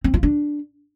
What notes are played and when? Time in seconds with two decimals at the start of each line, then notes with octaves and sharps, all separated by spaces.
0.04 C4
0.14 F4
0.23 D4